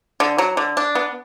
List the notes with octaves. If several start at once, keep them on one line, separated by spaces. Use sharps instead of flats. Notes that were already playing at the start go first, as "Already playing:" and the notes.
D3
F#3
D3
D4
B3